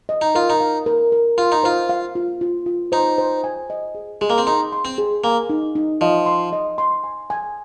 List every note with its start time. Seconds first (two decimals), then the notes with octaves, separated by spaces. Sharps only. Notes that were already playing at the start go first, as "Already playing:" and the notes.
0.09 D#5
0.21 D#4
0.35 F4 A#4
0.50 D#4
0.61 F5
0.86 A#4
1.12 A#4
1.38 F4 C6
1.52 D#4
1.64 F4 C5
1.89 F5
2.15 F4
2.41 F4
2.66 F4
2.92 D#4 C5
3.18 C5
3.44 G#5
3.70 D#5
3.95 G#4
4.21 G#3 G#4
4.30 A#3
4.38 C4
4.46 D#4 C6
4.73 C6
4.85 C4
4.98 G#4
5.24 A#3 G#5
5.50 D#4
5.75 D#4
6.01 F3 D#5
6.26 C6
6.53 D#5
6.78 C6
7.04 G#5
7.30 G#5